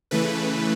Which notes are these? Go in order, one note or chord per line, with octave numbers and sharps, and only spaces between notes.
C#3 E3 A3 B4